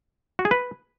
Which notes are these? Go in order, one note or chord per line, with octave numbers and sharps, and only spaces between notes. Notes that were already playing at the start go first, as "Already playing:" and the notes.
F#4
G#4
B4